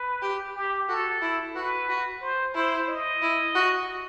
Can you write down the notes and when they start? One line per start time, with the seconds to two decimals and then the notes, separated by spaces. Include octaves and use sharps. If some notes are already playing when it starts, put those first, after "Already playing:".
Already playing: B4
0.22 G4
0.55 G4
0.89 F#4 A4
1.22 E4
1.55 F#4 B4
1.89 F#4
2.22 C5
2.55 E4 C5
2.89 D#5
3.22 E4
3.55 F#4